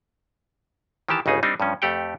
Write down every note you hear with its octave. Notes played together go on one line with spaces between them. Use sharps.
D#3 E3 G4 A5
G1 C#2 C#3 D#4 G#4
G3 C4 D4 D#4
G2 F3 C#4
F2 A3 G4 F#5 G5